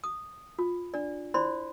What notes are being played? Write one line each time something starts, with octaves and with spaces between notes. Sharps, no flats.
D#6
F4
D4 D5
E4 C5 D5 B5 C6